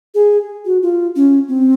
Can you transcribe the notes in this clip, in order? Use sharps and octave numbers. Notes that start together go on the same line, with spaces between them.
G#4
F#4
F4
C#4
C4